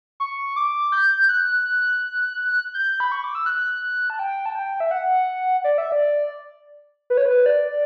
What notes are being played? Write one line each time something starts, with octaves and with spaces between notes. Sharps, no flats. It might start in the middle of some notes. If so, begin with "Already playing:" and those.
C#6
D6
G6
F#6
G6
B5
C#6
D6
E6
F#6
A5
G5
A5
G5
E5
F#5
D5
E5
D5
B4
C#5
B4
D5